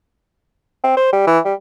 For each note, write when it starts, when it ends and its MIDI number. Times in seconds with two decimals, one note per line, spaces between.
0.84 0.97 60
0.97 1.12 72
1.13 1.25 55
1.27 1.39 52
1.45 1.54 55